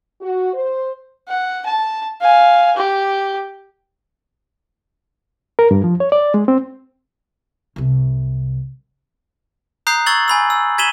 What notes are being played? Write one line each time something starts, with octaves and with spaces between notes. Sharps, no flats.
F#4
C5
F#5
A5
F5 G#5
G4
A#4
G2
F3
C#5
D5
G#3
C4
C2 C3
A#5 D#6 F#6 G6 C7
C#6 E6 G#6 A6 F#7
G#5 B5 E6
E6
G#6 B6 D#7 E7 F#7 G7